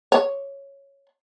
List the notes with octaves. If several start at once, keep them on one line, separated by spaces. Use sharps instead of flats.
C#5